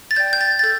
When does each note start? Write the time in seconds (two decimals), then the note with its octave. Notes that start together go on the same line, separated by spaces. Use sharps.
0.11 A6
0.16 D5 G5 G6
0.33 G6
0.41 A6
0.59 A6
0.63 A4 G6